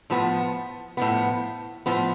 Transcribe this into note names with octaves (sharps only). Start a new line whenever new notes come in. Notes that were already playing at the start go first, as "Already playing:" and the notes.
A2 F3 B3
A2 F3 B3
A2 F3 B3